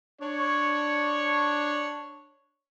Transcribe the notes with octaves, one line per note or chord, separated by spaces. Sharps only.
D4 C#5